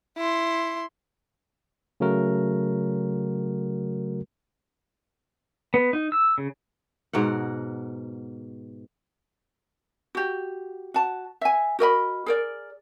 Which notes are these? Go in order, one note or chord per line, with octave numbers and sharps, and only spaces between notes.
E4 C6
C#3 F#3 A3 F#4 A#4
B3
D#4
E6
C#3
G#2 B2 A#4 F#5
F#4 G4
F#4 A5
E5 G#5
F#4 A#4 D#5 B5
G#4 A#4 D5